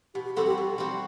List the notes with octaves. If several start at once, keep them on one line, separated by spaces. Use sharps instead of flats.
B2 G4
G4
G3 C4 F#4 A4
G4
B2
G3 C4 F#4